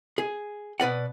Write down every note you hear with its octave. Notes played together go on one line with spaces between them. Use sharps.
G#4
B2 B4 D5 F#5